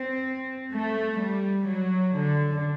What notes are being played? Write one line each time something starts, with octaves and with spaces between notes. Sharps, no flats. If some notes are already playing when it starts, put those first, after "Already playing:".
Already playing: C4
A3
G3
F#3
D3